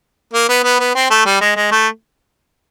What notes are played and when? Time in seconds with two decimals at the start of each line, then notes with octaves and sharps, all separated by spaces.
0.34 A#3
0.49 B3
0.64 B3
0.80 B3
0.95 C4
1.10 A3
1.25 G3
1.41 G#3
1.56 G#3
1.72 A3